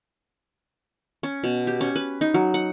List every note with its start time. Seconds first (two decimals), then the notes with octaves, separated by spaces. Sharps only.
1.23 C#4
1.44 B2
1.67 G4
1.81 C#4
1.95 B4
2.21 D#4
2.34 F#3
2.54 F#5